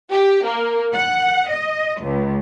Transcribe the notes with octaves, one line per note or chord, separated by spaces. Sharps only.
G4
A#3
F#5
D#5
C#2